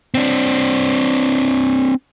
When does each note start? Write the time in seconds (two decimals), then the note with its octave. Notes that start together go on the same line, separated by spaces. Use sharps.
0.14 C4 D4